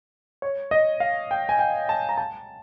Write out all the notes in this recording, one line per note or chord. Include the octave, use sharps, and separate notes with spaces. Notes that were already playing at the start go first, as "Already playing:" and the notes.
C#5
D#5
F5
G5
G#5
G5
A5
A#5
A5